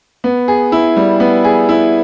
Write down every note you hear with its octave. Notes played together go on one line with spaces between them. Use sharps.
B3
G#4
E4
G3
B3
G#4
E4